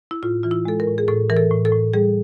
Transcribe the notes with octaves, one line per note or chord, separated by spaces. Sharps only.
E4
A2 F4
E3 F4
E4
G#3 A4
A#4
A2
G#4
A2 A4
E3 A#4
A4
A2
A4
A2
G3 G#4